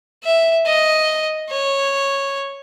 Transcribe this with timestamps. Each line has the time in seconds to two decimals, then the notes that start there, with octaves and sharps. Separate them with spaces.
0.25 E5
0.66 D#5
1.50 C#5